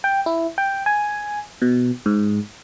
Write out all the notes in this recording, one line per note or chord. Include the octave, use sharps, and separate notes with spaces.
G5
E4
G5
G#5
B2
G#2